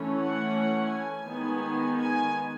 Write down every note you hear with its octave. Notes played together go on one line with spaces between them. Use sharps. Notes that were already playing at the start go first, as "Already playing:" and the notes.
Already playing: E3 A3 C#4
F#5
G#5
D#3 G#3 B3
G#5